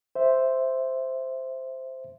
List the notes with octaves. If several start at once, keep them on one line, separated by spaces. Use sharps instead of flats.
C5 E5